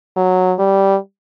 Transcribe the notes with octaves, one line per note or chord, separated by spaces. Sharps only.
F#3
G3